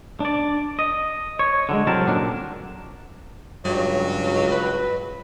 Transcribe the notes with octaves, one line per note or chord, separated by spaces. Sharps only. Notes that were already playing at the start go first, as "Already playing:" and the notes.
D4 D5
D#5
C#5
D3 F#3 G#3
C2 F#3 C4 A#4 A5
F#2 A#2 D3 F#3 D4
C#2 G2 F#3
B4